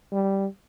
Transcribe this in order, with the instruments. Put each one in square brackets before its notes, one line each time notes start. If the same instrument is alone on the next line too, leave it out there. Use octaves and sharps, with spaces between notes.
[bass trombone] G3